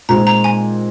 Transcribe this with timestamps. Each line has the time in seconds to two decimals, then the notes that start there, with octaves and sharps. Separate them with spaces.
0.09 A#2 G#3 C4 D#4 A#5
0.27 A#5
0.44 G#5